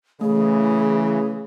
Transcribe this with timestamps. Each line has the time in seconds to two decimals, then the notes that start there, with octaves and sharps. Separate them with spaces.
0.21 C#3 E3 A3 G#4